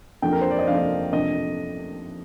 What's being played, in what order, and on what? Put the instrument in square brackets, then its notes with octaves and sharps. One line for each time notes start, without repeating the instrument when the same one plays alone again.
[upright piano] F2 C3 F3 A#3 D4 [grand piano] G5
[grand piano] A#4
C5
D5
D#5
[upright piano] F2 C3 F3 A#3 D4 [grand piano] F5
[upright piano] C3 F3 A#3 D4 [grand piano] D#5